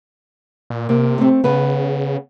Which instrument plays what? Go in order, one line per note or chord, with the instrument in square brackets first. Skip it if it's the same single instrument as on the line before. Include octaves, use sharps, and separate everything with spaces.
[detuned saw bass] A#2
[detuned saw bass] C3 [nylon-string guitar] A#3
[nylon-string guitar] A3 C4
[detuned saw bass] C#3 [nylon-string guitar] B3 B4